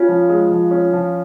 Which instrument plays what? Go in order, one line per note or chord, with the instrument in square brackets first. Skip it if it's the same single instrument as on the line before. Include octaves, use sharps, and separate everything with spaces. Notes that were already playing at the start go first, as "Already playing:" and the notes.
Already playing: [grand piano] C#4 [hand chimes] F4
[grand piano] F3
G#3
F3
C#4
F3